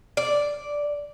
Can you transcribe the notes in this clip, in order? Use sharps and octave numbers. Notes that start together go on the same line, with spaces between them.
D5